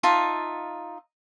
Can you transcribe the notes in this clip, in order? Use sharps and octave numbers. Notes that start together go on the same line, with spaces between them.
D#4 F4 E5 A5